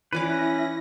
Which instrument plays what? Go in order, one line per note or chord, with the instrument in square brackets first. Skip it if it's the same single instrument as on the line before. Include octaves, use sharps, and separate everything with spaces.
[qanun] E3 D5 D6 [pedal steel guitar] C#4 B4 [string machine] E4 A#6